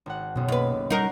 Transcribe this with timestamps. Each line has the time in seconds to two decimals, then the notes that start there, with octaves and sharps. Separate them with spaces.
0.06 G#1 F#5
0.36 F#1 B1 B2
0.48 D#2 B4
0.90 G3 D#4 A#4 F#5 C#6 C7